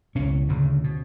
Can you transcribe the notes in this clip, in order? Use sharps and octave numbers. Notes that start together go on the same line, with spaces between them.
C#2 B2 C#4
D2 C#3
B2